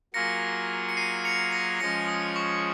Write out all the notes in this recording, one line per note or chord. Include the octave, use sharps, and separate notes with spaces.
F#3 A#3 F4 G#4 A#6 C#7
C#7
C7 D#7
C#7 F7
A#6 C#7
F3 G#3 C#4 A#6 C#7
D#6
C#6